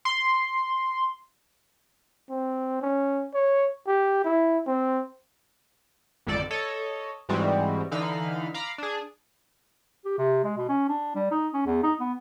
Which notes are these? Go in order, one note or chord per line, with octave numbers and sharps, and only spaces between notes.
C6
C4
C#4
C#5
G4
E4
C4
G#1 F2 D3 A4 D5
A4 C#5 D#5
G#2 E3 G3 G#3 C4 F#4
D3 E3 D#4 F5 B5 F6
F5 A#5 B5 D6 F6
D4 G#4
G4
C3
G#3
B2
C#4
D4
G3
D#4
C#4
E2
D#4
B3